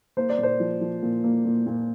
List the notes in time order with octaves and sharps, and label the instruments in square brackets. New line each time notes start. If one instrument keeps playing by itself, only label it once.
[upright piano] A#3 C5
D5
A#2 C5
F3
F3
A#2
A#3
A#2
A#2